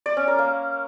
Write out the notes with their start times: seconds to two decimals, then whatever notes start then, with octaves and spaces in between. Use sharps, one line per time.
0.06 D5
0.17 C#4
0.28 A#4
0.39 A#3